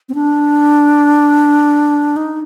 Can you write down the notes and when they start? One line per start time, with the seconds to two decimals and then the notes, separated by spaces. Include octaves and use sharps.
0.09 C4
0.15 D4
2.16 D#4